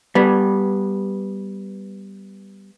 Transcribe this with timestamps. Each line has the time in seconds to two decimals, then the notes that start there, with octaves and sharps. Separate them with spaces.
0.15 G3 B3